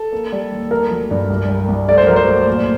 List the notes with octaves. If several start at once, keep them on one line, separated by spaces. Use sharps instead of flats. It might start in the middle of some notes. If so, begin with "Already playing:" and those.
Already playing: A4
A#3
G3
D#2
A3 A#4
F#3
G2
C2
G3
C2
A3 D5
C5
F#3 A#4
C5
D2
A#2